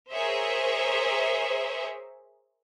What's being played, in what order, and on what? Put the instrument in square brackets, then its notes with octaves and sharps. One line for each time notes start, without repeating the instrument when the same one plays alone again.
[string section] G#4 A#4 C5 C#5 E5